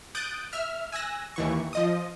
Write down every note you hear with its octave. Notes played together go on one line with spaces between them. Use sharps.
D#6 F#6 G6 A6 D7
E5 F6
G#5 E6 F#6 A#6
D#2 E3 C#6
F3 D#5 D#6